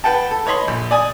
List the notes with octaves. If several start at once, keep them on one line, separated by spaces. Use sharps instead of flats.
B4 F#5 G5 A5
A4
B4 C#5 D#5 B5 C6
A#1
D5 G#5 D#6